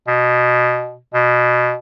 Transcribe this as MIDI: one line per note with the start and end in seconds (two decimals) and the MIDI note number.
0.08 0.97 47
1.14 1.74 47